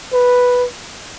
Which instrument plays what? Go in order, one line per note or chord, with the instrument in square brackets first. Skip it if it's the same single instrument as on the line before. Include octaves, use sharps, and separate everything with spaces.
[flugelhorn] B4